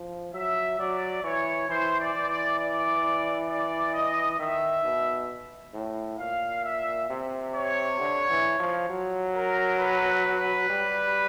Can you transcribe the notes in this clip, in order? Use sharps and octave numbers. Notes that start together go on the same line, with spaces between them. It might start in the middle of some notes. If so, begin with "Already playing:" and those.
Already playing: F3
F#3 E5
F#3 D5
E3 C#5
E3 C5
D5
E3
D5
D5
D5
D#5
D#3 E5
B2
A2
A#2 F5
E5
C3
C#5
D3
E3
F3
F#3
A#4
B4
G3